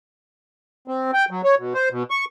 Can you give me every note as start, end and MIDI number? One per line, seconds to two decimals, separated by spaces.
0.88 1.11 60
1.13 1.25 79
1.31 1.41 54
1.44 1.55 73
1.59 1.73 47
1.74 1.89 72
1.91 2.03 47
2.11 2.25 85